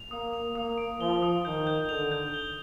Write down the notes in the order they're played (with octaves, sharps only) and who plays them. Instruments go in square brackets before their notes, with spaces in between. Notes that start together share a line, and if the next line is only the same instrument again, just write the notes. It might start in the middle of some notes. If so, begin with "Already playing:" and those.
Already playing: [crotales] F7
[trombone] A#3 [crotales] D#6
[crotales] F7
[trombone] A#3 [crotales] D#6
[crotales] D7
[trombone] F3 [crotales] G7
[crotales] D#6
[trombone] D#3 [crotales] G6
[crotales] G6
[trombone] D3 [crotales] F7
[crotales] G6
G7